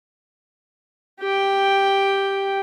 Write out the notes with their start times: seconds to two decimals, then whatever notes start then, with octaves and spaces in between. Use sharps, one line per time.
1.20 G4 G5